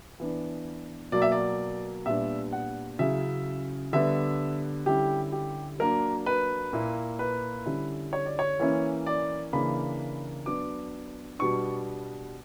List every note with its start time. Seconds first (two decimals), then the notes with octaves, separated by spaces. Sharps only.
0.20 E3 B3 D4
1.12 B2 F#3 A#3 D5
1.22 E5
1.32 D5
2.06 A#2 G3 B3 D4 E5
2.53 F#5
2.99 C#3 F#3 C#4 E4 E5
3.93 D3 G3 B3 D4 E5
4.86 D3 G3 C#4 E4 G4
5.32 G4
5.79 F#3 A#3 D4 A#4
6.26 B4
6.73 A#2 A#3 E4
7.19 B4
7.66 D3 G3 C#4 E4
8.13 C#5
8.26 D5
8.39 C#5
8.60 E3 A#3 C#4 E4
9.06 D5
9.53 C#3 E3 A#3 D4 B5
10.46 F#3 B3 D4 D6
11.39 B2 G3 B3 D4 C#6